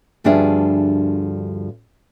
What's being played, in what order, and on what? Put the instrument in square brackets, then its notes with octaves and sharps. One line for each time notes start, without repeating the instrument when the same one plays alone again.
[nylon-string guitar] D2 G2 F3 D4 G#4 E5